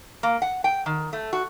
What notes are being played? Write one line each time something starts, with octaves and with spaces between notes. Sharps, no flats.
A#3
F#5
G5
D#3
A3
F#4